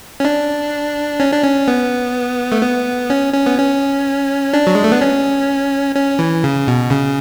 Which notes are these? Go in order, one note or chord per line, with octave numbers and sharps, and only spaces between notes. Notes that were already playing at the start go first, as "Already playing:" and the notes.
C#4
D4
C#4
D4
C#4
B3
A3
B3
C#4
C#4
B3
C#4
D4
F#3
G#3
A3
B3
C#4
C#4
E3
C#3
B2
C#3